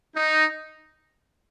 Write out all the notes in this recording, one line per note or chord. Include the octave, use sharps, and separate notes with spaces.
D#4